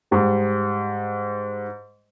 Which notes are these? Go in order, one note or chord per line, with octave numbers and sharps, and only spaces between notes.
G#2 G3